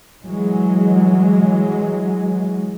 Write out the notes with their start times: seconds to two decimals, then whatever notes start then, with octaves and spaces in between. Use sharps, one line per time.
0.23 E3 F#3 G#3